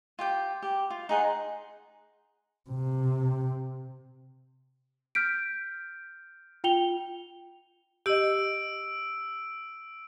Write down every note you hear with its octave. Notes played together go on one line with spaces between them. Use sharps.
F4 G4 G5
G4
F4
D#4 G#4 F#5 C6
C3
F6 G6 B6 D7
F4 G5 F7 G7
G4 D#5 E6 D7